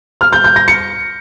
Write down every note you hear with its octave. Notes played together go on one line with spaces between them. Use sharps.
F6
G6
G6
A#6
C#7